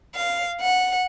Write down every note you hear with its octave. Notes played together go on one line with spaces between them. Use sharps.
F5
F#5